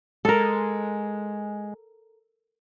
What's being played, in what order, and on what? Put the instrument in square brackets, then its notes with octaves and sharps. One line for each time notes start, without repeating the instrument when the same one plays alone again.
[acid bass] G#3 [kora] A4 A#4